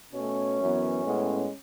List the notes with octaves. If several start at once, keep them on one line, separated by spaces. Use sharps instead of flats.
B2 A3 C#4
F#2 E3 B3
A2 G#3 B3